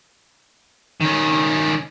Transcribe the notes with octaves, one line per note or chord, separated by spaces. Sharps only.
D#3 C#4